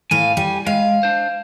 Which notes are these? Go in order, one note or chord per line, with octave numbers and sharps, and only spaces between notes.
A2 F5 G#5
G3
G#3 F5
D4 C5